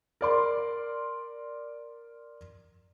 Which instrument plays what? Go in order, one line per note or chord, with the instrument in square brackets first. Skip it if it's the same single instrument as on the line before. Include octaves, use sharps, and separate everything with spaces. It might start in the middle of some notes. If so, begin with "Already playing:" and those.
[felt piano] A#4 D5 C6